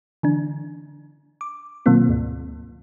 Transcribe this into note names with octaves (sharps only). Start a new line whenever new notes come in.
D3 E3 D4
D6
B2 D#3 F#3 A#3 C4 F4
D2 G#2